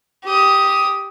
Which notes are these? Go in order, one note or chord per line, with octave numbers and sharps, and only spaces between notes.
G4 D#6